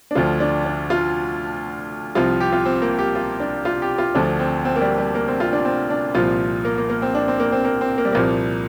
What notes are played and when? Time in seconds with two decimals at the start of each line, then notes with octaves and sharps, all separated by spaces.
0.11 D4
0.15 D2 D3 F3 F4
0.40 D4
0.66 D4
0.90 F4
2.15 C2 C3 F3 F4
2.40 G4
2.53 F4
2.65 C4
2.82 A#3
2.99 G4
3.15 F4
3.40 D4
3.65 F4
3.82 G4
3.98 F4
4.14 D2 D3 F3 D4
4.40 C4
4.65 C4
4.76 A#3
4.81 G3
4.98 G3
5.15 A#3
5.28 C4
5.40 F4
5.53 D4
5.65 C4
5.90 D4
6.15 C2 A#2 F3 F4
6.65 A#3
6.78 A#3
6.90 A#3
7.02 C4
7.15 D4
7.28 C4
7.40 A#3
7.52 C4
7.64 A#3
7.81 C4
7.98 A#3
8.05 G3
8.12 C2 A#2 F3 A#3